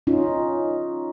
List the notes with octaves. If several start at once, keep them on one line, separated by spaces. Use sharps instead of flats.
C#4 D#4 F4